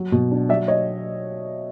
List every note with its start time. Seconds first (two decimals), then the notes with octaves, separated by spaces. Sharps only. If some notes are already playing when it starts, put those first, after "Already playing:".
Already playing: F#3
0.12 B2
0.31 D4
0.49 F#3 D5 E5
0.68 C#5 D#5